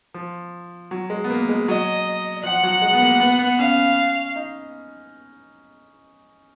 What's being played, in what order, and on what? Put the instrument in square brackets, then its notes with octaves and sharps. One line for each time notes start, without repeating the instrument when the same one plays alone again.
[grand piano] F3
F#3
G#3
B3
A#3
G#3
[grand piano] F#3 [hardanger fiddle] D#5
[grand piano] F3 [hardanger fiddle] F#5
[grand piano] F#3
G#3
B3
A#3
B3
B3
[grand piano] C#4 [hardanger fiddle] F5
[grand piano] D#4